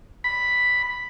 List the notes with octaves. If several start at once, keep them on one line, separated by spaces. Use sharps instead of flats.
B5